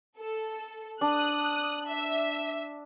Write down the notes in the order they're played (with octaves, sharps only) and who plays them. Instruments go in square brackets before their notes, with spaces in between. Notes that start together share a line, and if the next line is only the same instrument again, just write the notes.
[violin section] A4
[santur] D4 [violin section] D#6 F#6
[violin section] E5